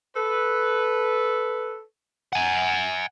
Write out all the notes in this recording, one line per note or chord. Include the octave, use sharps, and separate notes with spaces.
A4 B4
F#5 G#5